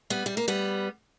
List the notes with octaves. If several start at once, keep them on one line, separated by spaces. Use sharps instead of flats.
G3 B3
G3
A#3
G3 B3